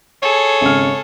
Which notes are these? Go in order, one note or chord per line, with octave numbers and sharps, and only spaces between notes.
G#4 A4 C#5
G#1 C#3 F6